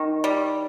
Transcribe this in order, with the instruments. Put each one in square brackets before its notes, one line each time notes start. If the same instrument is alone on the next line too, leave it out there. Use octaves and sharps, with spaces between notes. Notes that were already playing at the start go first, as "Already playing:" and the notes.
Already playing: [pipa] D#3
G3